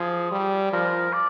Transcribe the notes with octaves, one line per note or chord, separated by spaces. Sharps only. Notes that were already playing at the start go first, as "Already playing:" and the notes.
Already playing: F3 G#4
G3
F3 A#4
D5